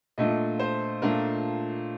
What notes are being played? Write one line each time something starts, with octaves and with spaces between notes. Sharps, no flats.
A#2 A3 D4 F4 D#5
C5
A#2 A3 D4 F4 A#4